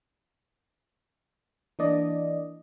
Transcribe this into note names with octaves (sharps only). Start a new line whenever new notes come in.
E3 A#3 D4 D5 D#5